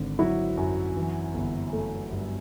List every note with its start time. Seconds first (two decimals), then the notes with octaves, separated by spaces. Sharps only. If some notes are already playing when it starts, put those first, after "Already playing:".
Already playing: G#1 D3
0.19 F#3 E4 F#4
0.57 F#2
0.96 E3
1.34 G1
1.73 A3
2.12 G2